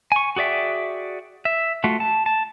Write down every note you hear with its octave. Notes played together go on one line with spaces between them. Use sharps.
G#5 C#6
F#4 G#4 D5 E5 G5
E5
A3 F4 F#4
A5
A5